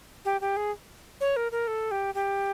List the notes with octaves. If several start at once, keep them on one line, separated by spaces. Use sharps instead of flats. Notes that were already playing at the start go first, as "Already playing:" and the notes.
G4
G4
G#4
C#5
A#4
A#4
A4
G4
G4